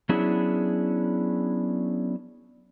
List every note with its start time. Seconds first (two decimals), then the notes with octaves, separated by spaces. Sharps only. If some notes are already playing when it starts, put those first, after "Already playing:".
0.09 F#3 B3 C#4 D4 E4 G#4